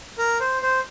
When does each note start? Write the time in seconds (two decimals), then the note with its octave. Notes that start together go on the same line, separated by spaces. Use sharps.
0.18 A#4
0.40 C5
0.62 C5